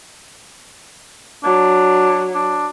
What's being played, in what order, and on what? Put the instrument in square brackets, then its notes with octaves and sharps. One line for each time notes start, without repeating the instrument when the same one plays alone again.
[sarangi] F#3 [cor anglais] D4
[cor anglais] D4